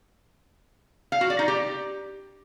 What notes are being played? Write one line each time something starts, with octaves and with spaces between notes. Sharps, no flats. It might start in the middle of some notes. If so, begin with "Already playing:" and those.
F5
F#4
D5
D#4
G4